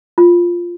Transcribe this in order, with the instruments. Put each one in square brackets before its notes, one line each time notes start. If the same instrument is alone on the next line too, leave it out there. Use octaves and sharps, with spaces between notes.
[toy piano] F4